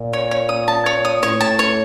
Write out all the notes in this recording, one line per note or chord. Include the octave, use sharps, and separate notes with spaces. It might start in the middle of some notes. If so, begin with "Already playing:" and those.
Already playing: A#2
C#5
C#5
D#6
A5
C#5
D#6
A2 C#5
A5
C#5